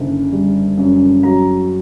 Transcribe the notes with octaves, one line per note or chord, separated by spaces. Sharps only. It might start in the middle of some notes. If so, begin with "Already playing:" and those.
Already playing: F#1 D3
G3
F#2
F#3 A#5